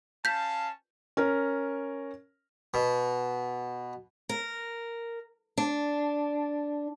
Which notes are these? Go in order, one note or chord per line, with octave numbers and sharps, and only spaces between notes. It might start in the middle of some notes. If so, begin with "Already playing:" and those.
C#4 F5 A5 G6 B6
C#4 A#4
B2
A#4
D4